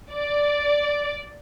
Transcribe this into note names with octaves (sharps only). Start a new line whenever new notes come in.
D5